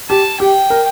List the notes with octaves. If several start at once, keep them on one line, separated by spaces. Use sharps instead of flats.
G4 A5
G4 G5
A#4